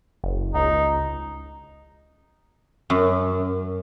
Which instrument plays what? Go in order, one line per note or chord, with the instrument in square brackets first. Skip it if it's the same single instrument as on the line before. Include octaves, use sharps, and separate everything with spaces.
[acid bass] F#1
[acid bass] C#2 [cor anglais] D#4
[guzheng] F#2